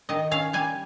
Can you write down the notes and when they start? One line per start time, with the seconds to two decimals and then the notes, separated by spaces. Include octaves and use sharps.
0.09 D#3 D#5
0.31 C#4 F5
0.53 G3 G#5